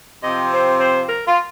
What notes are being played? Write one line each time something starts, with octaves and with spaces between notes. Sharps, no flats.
C3 F3 C4 D#5
C5
C5
A#4
F4